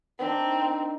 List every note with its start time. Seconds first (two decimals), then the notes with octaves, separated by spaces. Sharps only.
0.19 C4 D4 D#4 A#4